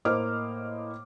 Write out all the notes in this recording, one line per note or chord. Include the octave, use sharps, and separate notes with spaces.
A2 A#3 C5 D#5 D6 F6